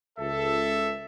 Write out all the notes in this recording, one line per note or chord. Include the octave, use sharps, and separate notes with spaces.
C#2 A4 E5